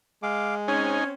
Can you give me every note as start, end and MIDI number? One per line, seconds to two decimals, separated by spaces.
0.23 0.97 56
0.23 0.55 77
0.23 0.55 86
0.68 1.13 60
0.68 1.13 61
0.68 1.04 63
0.68 1.09 73
0.68 1.04 80